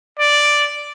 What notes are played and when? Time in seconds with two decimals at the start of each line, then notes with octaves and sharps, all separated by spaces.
0.19 D5